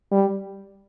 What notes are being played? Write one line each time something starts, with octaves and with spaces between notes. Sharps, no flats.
G3